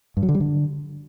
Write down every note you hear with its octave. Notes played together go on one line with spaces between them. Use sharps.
G2
F#3
D3
G3
D3